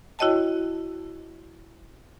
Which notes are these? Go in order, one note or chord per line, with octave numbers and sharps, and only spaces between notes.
E4 F#4 C#5 D#5 G5 A5